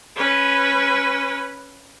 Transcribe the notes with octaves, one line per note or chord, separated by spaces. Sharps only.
C#4 B4